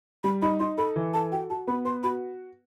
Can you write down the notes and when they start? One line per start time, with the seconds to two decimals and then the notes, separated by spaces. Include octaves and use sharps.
0.24 G3 B5
0.42 D#4 B5
0.60 D#4 C6
0.78 A4 B5
0.96 E3
1.14 A4 A5
1.32 F#4 G5
1.50 F#4 A5
1.67 B3 B5
1.85 B4 C6
2.03 F#4 B5